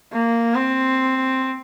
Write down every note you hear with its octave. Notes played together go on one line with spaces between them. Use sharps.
A#3
C4